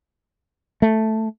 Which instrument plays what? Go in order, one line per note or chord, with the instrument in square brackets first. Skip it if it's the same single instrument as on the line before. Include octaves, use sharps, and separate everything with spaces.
[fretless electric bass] A3